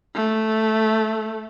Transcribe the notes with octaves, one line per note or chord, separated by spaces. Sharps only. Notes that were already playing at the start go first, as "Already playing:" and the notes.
A3